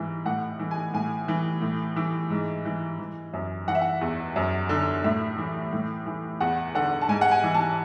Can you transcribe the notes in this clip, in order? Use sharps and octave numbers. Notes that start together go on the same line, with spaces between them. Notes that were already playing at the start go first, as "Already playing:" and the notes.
Already playing: G#2 E3
A2 F#5
E3
G#5
A2 G#5
E3
A2
E3
G#2
E3
E3
F#2
E3 F#5
E5
F#5
E2
F#2
D3
A2 E5
E3
A2
E3
E2 F#5
D3 F#5
A5
G#2 G#5
F#5
G#5
E3
A5